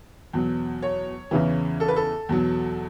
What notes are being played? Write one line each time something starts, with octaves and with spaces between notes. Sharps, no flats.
E2 B2 F#3
C#5
E2 C#3 E3
A4
B4
A4
E2 B2 F#3